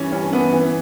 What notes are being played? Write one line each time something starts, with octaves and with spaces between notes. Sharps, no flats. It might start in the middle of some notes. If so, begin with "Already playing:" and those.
Already playing: G2 E3 C#4
G2 C#4
E3 B3
E3